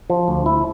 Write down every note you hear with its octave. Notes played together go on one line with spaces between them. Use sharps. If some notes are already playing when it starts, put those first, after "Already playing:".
F3
D2
E4